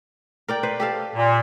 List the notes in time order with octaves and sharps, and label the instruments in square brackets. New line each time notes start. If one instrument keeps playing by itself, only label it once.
[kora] A#4 D5 G5
B4 C5
G4 A4 F5
[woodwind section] A#2